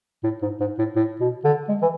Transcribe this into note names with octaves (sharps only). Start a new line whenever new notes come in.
A2
G#2
G#2
A2
A2
B2
D3
G#3
E3